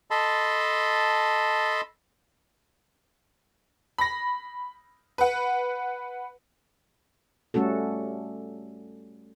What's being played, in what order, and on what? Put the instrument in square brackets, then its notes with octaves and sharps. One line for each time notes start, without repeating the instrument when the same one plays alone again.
[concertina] A4 D#5 A5 B5 C6
[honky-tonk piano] B5 A#6
B4 F#5
[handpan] G3 A3 C#4 F#4 A4